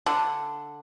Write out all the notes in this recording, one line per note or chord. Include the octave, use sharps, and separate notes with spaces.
D3